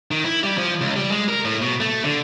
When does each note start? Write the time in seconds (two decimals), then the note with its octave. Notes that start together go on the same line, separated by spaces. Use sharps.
0.11 D#3
0.25 E4
0.43 G3
0.58 F3
0.81 C#2
0.96 G3
1.11 G#3
1.29 A#4
1.45 A2
1.62 B2
1.80 A3
2.04 D3